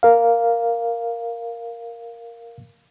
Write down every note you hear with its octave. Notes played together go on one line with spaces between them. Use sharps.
A#4 F5